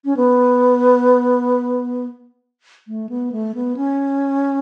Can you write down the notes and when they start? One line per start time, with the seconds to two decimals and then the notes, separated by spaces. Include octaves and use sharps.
0.05 C#4
0.17 B3
2.87 A3
3.09 B3
3.32 A3
3.55 B3
3.77 C#4